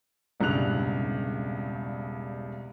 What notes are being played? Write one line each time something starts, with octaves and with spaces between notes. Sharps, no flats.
E1 C2 G2 C#3 F#6 F7